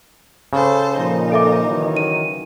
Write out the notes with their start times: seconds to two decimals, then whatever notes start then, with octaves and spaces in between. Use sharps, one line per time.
0.53 C#3 A4 C5
0.97 A#2 F3 D#4
1.32 A4 E5 D6
1.67 D#3 E3 F#3
1.97 D#7